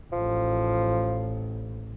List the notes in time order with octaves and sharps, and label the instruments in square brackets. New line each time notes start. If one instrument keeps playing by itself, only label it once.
[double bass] A1 [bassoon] F3